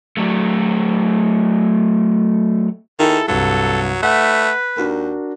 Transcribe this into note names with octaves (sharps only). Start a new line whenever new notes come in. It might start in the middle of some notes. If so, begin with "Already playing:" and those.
F#3 A3
D#3 E4 G#4 A4
C2 G2 F#3 A4
A3 B4 F#5
D#2 D4 F#4 A#4